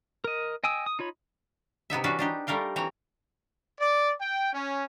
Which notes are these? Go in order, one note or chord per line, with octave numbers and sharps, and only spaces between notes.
A#4 D#5
D#5 G5 G#5 D#6 E6
D#6
D#4 F4 C#5 B5
C3 B3 D#4 E5
E3 C#4 D4 F#4 B4
D4 D#4 G4
G3 A3 A#4 F5 G5
E3 C4 C#5 A#5
D5
G5
C#4